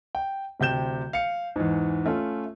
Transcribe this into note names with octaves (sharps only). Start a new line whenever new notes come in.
G5
D1 C3 G5 G6 E7
F5 C#7
E2 G#2
A3 C#4 F4